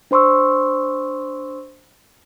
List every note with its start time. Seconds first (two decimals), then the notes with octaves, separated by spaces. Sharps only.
0.11 D4 C5 C6 C#6 E6